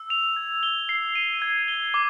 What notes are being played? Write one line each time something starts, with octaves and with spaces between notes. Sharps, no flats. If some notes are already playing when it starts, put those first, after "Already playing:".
Already playing: E6
F7
G#6
G7
C7
D#7
G#6
G7
D6